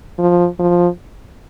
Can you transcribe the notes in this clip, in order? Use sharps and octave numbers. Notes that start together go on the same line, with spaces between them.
F3
F3